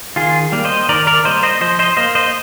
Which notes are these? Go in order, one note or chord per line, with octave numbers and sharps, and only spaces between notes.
D#3 F4 G#4
G3 A#3
C5 D#5
D#3 A#4 D5
A#4 D5
G3 A#3 C5 D#5
C5 D#5
F3 C5 D#5
C5 D#5
A#3 C5 D#5
C5 D#5